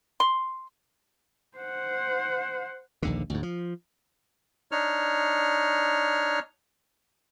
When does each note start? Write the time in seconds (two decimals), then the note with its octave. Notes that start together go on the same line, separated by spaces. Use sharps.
0.20 C6
1.58 C5 F#5
3.03 A#1 D#2 D3
3.30 D2 G#2
3.43 F3
4.72 D4 D#4 C#5 F6